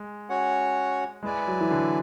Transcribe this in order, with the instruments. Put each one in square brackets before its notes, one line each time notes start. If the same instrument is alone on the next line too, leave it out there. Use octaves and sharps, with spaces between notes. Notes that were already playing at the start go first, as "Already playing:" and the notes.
Already playing: [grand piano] G#3
[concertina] C#4 F#4 C#5 F#5
[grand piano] G#3 [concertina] E4 B4 D5 G#5
[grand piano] F#3
E3
D3